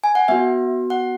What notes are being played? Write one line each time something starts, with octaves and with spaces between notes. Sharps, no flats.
G#5
F#5
B3 F#4 E5
F#5